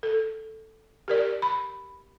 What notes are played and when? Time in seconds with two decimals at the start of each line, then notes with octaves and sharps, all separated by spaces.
0.03 A4
1.08 G4 A#4 D5
1.42 B5